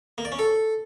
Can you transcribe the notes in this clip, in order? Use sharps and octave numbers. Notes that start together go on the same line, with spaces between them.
A#3
D5
C#4
A4